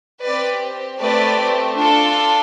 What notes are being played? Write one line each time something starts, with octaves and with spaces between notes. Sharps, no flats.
C4 G4 B4 D5
A3 C4 G4 B4 D5
D4 F4 A4